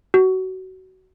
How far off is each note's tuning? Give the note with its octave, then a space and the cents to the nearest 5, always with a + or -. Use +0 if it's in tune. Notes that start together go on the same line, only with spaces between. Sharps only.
F#4 +25